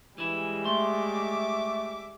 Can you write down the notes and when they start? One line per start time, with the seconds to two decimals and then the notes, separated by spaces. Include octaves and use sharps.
0.18 E3 G3 G#3 E4
0.65 A3 E5 C6 D6